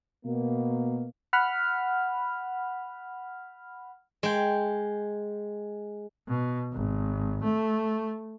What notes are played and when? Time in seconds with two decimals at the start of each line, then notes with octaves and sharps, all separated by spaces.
0.25 B2 A#3
1.33 F#5 B5 F6
4.23 G#3 G5
6.28 B2
6.73 G#1
7.43 A3